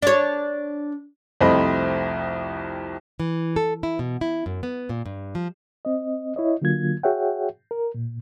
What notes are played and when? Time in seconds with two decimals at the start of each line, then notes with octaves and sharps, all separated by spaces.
0.02 D4 C#5
1.41 C2 F2 A3 C4 D#5 B5
3.20 E3
3.56 A4
3.83 E4
3.99 B2
4.21 E4
4.46 F#2
4.63 B3
4.89 A#2
5.06 G2
5.35 F3
5.85 C4 D#5
6.36 E4 C#5 D#5
6.62 D3 F#3 A#3 F4 G#6
7.03 F#4 G#4 C#5 E5 F#5 G5
7.71 A#4
7.94 A#2